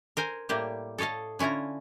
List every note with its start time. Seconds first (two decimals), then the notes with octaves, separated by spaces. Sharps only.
0.17 A#4 C5 G#5
0.49 A2 G3 A#3 G4
0.98 A4 C#5 D#5 F5 A5
1.39 D3 C#4 E4 F4 A#5